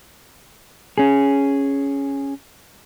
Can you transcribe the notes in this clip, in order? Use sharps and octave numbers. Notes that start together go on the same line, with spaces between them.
C#4 G#4